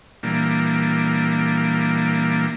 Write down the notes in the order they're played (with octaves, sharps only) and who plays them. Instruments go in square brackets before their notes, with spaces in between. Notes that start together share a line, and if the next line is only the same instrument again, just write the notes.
[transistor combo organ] A#2 E3 G3 A#3 D4